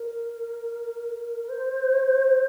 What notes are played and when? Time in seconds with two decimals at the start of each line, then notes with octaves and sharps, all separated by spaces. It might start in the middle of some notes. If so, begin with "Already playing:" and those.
Already playing: A#4
1.49 C5